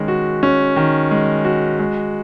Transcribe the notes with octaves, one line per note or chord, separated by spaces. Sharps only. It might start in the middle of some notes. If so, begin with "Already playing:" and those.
Already playing: D#3 G#3 C#4
F#4
C#4
D#3
G#3
F#4
G#3